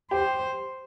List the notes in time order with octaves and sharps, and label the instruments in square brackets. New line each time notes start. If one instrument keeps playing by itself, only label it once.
[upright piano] G4 [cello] C5